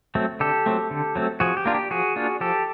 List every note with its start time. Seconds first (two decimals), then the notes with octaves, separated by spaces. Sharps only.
0.15 F#3 A3 C4
0.40 D3 G4 A4
0.66 F#3 A3 C4
0.91 D3
1.16 F#3 A3 C4
1.40 F3 F#4 G#4
1.57 G4
1.65 A#3 D4 F4
1.74 G4
1.91 F3 F#4 G#4
2.16 A#3 D4 F4
2.41 F3 G4 A4